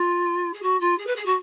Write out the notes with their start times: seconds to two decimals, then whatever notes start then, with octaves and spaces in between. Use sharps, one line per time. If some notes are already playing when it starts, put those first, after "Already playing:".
Already playing: F4
0.53 G#4
0.62 F#4
0.80 F4
0.98 G#4
1.06 B4
1.15 G#4
1.25 F#4